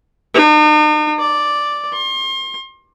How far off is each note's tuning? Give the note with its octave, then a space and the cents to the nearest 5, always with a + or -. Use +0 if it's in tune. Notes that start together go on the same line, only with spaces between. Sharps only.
D#4 -45
D5 +0
C6 +35